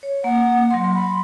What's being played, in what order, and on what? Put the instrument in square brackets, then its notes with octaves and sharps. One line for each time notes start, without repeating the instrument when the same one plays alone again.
[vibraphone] C#5
[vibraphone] A#3 [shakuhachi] F#5
[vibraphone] F#3 C6
[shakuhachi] B5